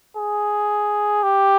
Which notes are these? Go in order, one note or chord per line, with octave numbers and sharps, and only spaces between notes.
G#4
G4